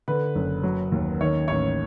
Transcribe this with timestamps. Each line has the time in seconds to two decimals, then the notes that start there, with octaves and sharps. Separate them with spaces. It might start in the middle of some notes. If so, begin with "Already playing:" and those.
0.08 D3 B4
0.35 F#1
0.63 F#3
0.92 D#2
1.21 D#3 C#5
1.48 A1 C#5